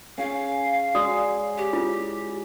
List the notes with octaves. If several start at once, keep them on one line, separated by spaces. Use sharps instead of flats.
C#4 G#4 F5
G#3 F#4 D5 D#6
G4
E4 F4